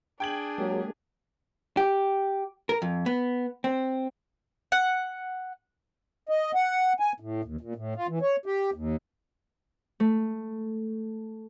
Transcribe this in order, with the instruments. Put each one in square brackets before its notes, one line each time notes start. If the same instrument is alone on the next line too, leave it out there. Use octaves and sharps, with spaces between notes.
[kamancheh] D4 G#4 [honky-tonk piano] G5 G#6 F#7
[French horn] F#3 [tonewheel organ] G#3 A#3 G4
[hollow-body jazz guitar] G4
A#4
F2
B3
C4
[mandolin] F#5
[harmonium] D#5
F#5
G#5
A2
D#2
A#2
A2
F4
E3
C#5
G4
D#2
[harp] A3